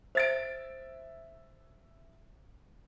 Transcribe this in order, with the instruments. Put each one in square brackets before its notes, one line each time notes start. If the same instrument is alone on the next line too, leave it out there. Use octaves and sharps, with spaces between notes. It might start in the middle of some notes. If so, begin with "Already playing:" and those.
[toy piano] C5 [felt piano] E5 A6 D7